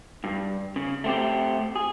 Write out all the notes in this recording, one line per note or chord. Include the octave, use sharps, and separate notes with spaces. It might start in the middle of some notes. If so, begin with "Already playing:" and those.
G2
C#3
A3 C4 G4
G#4